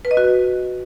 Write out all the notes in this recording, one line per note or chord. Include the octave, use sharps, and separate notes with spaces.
B4
D#5
F#4